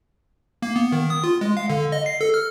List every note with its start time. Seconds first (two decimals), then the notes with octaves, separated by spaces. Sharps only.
0.62 A#3
0.76 B3
0.92 D#3
1.10 D#6
1.24 F4
1.41 G#3
1.57 F5
1.70 D3
1.92 D#5
2.06 C7
2.21 A4
2.34 F6